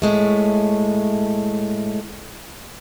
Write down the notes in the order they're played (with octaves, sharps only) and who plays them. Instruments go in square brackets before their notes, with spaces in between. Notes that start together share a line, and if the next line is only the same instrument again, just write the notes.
[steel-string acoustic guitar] A2 G#3 A3